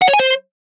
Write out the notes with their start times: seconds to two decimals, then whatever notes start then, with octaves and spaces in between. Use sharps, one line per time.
0.02 F#5
0.08 C#5
0.14 G#5
0.19 C5